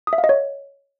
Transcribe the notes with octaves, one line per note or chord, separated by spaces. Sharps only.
D#6
E5
F5
D#5
C#5